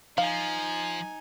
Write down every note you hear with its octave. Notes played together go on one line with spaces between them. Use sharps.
F3 D#4 F5 G#5